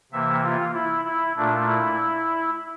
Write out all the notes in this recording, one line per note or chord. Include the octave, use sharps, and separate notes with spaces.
C3 E3 A#3 E5
F4
E4
E4
A#2 A3 D4
E4